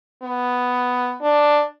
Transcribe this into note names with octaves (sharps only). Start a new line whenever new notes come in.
B3
D4